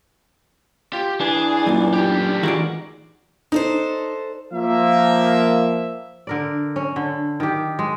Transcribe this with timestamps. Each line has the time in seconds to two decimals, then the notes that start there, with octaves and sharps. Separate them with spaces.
0.93 F4 G4
1.21 E3 D4 G#4 G#5
1.67 F#2 A#2
1.93 A2 G4
2.43 D#3 E3 G#3 F4 F#4 D5
3.52 D4 D#4 A4 C5
4.52 F3 A#3 E5
6.27 D3 A#4 D5
6.76 C#4
6.96 D3
7.40 D#3 G4
7.79 G#3